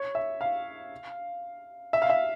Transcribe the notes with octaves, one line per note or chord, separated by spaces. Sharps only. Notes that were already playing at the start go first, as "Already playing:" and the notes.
Already playing: C#5
E5
F5
E5
F5
E5